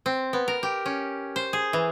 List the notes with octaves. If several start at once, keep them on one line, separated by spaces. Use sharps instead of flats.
C4
B3
A#4
G4
C#4
C5
G#4
E3